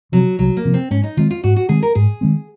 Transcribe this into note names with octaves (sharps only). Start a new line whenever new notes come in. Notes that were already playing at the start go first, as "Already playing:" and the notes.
C3 F3 F#3
C2 F#3
A#3
C3 F3
C4
G#2 C#4
D#4
D#3 G#3 C4 F4
F4
G#2 F#4
F#4
D#3 G#3 C4 G#4
A#4
G#2 G#4
D#3 G#3 C4